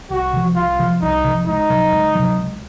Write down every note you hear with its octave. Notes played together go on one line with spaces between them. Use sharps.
C2 F#4
C3 F3
C2 F4
C3 F3
C2 D#4
C3 F3
C#2 D#4
C3 F#3
C#2
C3 F#3
C#2